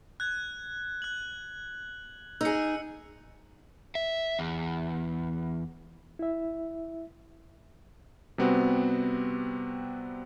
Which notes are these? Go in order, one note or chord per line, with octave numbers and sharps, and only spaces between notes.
F#6 G#6
F#6 F#7
D#4 G#4 E6 C#7
E5
E2
E4 E5
C3 G3 B3 C4 F#4